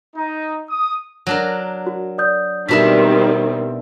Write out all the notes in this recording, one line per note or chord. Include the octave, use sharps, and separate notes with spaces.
D#4
D#6
F#3 D4 A#4
F#4
D5 D#6 G6
B2 D#3 G3 C4 D4 E4 F#4 B6